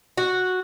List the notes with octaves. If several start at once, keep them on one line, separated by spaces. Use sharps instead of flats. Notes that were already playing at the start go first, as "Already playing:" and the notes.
F#4